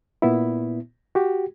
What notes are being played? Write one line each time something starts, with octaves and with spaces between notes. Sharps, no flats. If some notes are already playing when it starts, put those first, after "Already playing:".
A#2 B3 E4
F#4 G4